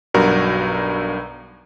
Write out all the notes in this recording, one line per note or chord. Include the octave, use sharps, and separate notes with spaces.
B1 G2 F#4 A#4 D5 A#5